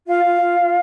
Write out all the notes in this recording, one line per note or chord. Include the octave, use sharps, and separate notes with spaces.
F4 F5
F4
F4
F4